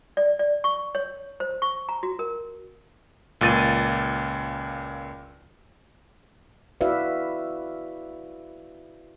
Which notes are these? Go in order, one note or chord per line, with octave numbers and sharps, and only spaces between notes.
D5
D5
C#6
C#5
C5
C#6
A#5
F#4
A#4
C#2 A#2 A6 D#7
E4 F#4 B4 D5 E5 F5